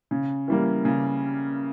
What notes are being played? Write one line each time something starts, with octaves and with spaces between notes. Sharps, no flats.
C#3
E3 G3 A#3
C#3